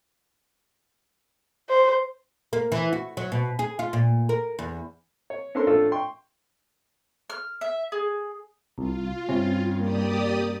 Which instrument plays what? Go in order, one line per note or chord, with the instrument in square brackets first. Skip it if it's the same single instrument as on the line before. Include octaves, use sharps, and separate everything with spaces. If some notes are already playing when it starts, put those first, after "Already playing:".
[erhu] C5
[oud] A#3
E3
F#4
F#3
B2
G#4
F4
A#2
A#4
E2
[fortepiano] C#5
C#4 D4 A4 A#4 C5 C6
A2 A3 D4 F4 A4 E6
G5 C6 C#6
[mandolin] F6
E5
G#4
[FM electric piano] C2 [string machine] F4
[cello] G2 [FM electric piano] C3 C#4
[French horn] A#3 [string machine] G4 D5 D#6